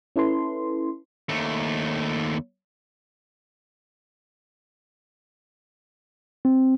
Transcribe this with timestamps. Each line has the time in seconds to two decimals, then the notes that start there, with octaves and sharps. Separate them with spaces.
0.16 C#4 E4 A4 B4 C6
1.29 D#2 A3
6.45 C4